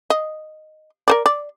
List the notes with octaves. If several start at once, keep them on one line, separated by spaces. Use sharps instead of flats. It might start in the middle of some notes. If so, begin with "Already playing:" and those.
D#5
A#4 C5 D5
D5